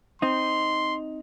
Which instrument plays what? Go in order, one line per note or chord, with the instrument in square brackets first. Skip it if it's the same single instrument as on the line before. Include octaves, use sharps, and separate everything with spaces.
[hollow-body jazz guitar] C4 D#4 [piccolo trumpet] C6